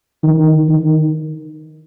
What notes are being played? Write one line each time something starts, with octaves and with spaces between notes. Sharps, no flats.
D#3
D#3